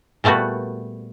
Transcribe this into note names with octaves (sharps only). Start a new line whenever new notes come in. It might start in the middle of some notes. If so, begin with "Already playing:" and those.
A#2 G3 A3 B3 F#4